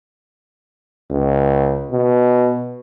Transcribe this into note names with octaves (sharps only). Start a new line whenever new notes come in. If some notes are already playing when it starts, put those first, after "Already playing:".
C#2
B2